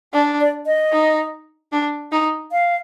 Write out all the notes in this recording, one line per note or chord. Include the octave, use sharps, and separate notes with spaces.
D4 D5
D5
D#5
D#4
D4
D#4
F5